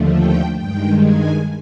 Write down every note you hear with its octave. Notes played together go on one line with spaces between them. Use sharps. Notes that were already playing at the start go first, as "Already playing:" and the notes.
Already playing: D#2 D3 F3 A3
G5
G2 D#3 G#3 G5
G#5